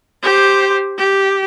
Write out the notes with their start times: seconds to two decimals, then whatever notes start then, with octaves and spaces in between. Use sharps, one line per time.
0.22 G4 C5
0.98 G4